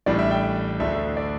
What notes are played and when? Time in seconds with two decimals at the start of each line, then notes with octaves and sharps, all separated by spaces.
0.06 A1 A2 G3 D4 D5
0.19 E5
0.31 G5
0.80 D2 D3 A3 D4 E5
1.17 D5